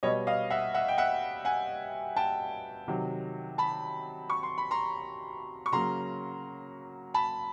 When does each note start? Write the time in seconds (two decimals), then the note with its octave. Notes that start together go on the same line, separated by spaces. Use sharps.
0.03 B2 G3 B3 C#5 D#5
0.27 D#5 F5
0.50 E5 F#5
0.74 E5 F#5
0.88 G5
0.98 E5 F#5
1.45 F#5 G#5
2.16 G5 A5
2.88 C3 D#3 F#3
3.58 A5 B5
4.30 C#6
4.43 C6
4.58 B5
4.71 A#5 C6
5.66 C#6
5.72 C#3 F#3 A#3 A#5 C6
7.14 A5 B5